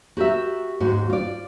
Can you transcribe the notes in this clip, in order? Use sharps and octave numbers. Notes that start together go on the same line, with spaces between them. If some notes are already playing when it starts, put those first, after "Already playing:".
F#4 G4 A#4 E5
D#2 G#2 D#4 F#4
F4 D5